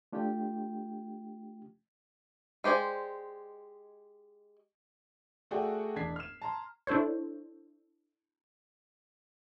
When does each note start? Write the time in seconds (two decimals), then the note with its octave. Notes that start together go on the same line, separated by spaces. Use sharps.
0.12 A3 D4 F4 G4 G5
2.64 G#3 G4 C5 D5 G#5
5.51 A3 F#4 G#4 D5 G5
5.96 E1 D4 G#6 B6 C7
6.16 F6 E7
6.42 A5 A#5 C6
6.87 D4 E4 A4 C5 C#5